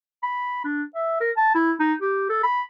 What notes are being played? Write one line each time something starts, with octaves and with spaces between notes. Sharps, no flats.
B5
D4
E5
A#4
A5
E4
D#4
G4
A4
B5